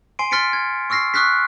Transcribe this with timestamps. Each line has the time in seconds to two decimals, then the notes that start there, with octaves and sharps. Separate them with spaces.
0.19 G#5 C6 C7 D7
0.31 C6 F6 A6 B6 C#7 D7
0.53 G#6
0.90 C#6 E6 F6 A#6 C7
1.14 C#6 D#6 F6 F#6 A#6 B6